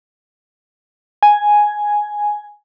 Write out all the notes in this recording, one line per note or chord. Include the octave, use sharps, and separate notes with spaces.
G#5